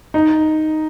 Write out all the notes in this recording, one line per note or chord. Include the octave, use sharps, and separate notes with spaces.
D#4